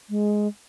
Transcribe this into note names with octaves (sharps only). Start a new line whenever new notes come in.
G#3